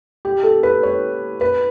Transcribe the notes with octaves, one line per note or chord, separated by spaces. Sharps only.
G4
A4
B4
C#5
B4